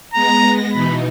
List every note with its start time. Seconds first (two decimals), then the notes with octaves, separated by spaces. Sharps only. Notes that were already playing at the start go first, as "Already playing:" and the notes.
0.14 G#3 B3 A#5 A#6
0.73 B2 E3 D#4 B5